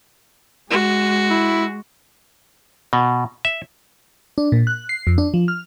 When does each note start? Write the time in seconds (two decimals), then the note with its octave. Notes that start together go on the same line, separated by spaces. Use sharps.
0.71 G#3 F#4
1.30 E4
2.93 B2
3.45 E5
4.38 D4
4.52 A#2
4.67 F#6
4.89 C7
5.07 F2
5.18 D4
5.34 F3
5.48 F6